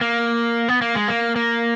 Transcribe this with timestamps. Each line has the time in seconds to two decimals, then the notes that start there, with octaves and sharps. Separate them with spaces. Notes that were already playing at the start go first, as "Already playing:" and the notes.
0.01 A#3
0.68 B3
0.81 A#3
0.95 G#3
1.08 A#3
1.36 A#3